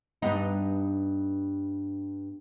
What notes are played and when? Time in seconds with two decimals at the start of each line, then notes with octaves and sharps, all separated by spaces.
0.22 G2 B3 D#4